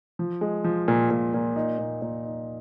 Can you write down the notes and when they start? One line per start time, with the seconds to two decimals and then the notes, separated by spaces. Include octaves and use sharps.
0.19 F3
0.41 G#3
0.65 F3
0.88 A#2
1.11 A#2
1.34 A#2
1.56 D#4
1.79 A#2
2.02 A#2
2.25 D#4